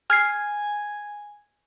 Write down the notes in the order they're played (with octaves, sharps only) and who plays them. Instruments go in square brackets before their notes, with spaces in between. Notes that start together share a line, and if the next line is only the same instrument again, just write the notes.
[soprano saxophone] G#5 [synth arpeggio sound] F6 G#6 C7